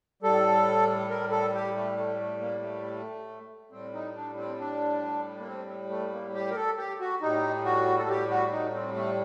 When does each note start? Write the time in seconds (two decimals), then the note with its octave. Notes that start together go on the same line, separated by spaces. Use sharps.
0.23 A2 G3 A4
1.10 A#4
1.31 A4
1.54 G4
1.76 A3
1.97 A3
2.20 A3
2.41 A#3
2.63 A3
3.72 A2 G3 C4
3.94 D#4
4.16 D4
4.38 C4
4.60 D4
5.40 A#3
5.46 C4
5.90 A3
6.12 A#3
6.34 G4
6.51 A#4
6.55 A4
6.78 G4
7.00 F#4
7.21 A2 G3 D#4
7.65 F#4
7.99 A4
8.09 G4
8.30 F#4
8.52 D#4
8.75 C4
8.96 A3